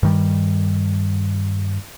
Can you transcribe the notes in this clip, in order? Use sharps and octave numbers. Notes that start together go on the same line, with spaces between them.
G2 D#3 G3